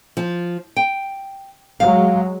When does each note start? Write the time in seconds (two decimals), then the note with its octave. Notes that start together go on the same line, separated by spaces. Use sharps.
0.17 F3
0.77 G5
1.80 F#3 G#3 F5